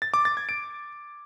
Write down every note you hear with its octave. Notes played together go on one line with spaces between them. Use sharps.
A6
D6
A6
G#6
D7